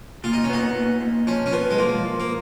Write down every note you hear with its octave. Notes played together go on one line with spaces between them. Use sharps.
A#2 F4
D#4
C#4
B3 D#4
A#2
A#2
F3 C#4
C#4
F3 B3
G#3
F3 A#3
F3
A#3